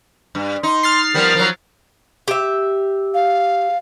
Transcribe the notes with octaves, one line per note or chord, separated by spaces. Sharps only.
G2
D#4 C6
F6 A6 C7
F3 G3 B3 A#4
F3 F#3
G4 E5
F5